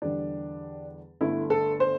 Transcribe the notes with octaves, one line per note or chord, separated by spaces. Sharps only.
E2 D3 G3 D4
G1 G2 D3 A3 E4
A4
C5